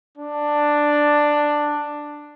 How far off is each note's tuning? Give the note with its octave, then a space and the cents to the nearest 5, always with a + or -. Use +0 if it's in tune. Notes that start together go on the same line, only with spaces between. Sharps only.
D4 +5